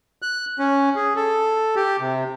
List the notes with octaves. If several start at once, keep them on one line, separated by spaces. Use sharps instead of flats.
F#6
C#4
G#4
A4
G4
C3